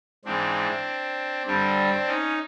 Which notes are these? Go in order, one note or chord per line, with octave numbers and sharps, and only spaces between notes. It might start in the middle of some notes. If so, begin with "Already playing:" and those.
G#2 E3 G#3 C4 D4
G2 D3 G3 C4 D4
C#4 D#4